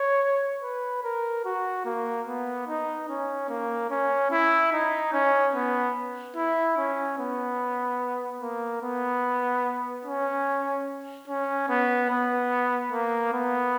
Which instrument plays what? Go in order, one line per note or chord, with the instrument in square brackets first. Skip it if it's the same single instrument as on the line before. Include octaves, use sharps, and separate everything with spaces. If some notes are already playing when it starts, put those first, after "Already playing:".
Already playing: [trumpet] C#5
B4
A#4
F#4
A#3
B3
D#4
C#4
A#3
C#4
E4
D#4
C#4
B3
E4
C#4
B3
A#3
B3
C#4
C#4
B3
B3
A#3
B3